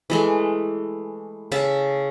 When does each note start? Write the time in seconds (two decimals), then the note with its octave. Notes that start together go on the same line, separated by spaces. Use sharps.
0.10 E3 G#3 A3
1.52 C#3 E5 A5